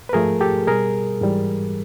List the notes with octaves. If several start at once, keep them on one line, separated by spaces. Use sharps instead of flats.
B4
G#2 F3 A3 G#4 A#4
G4 A4
B2 G3 G#4 A#4
G#2 E3 G3